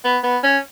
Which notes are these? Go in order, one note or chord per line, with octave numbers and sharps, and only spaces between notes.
B3
B3
C#4